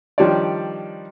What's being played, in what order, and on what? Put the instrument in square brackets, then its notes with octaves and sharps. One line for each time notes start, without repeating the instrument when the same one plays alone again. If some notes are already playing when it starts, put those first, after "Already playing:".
[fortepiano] D#3 F3 G3 D4 C#5 D5